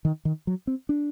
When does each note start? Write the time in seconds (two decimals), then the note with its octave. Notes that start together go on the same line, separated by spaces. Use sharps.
0.05 D#3
0.25 D#3
0.47 F#3
0.67 C4
0.89 D4